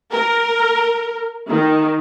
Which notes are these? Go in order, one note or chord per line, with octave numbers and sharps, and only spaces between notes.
A#4
D#3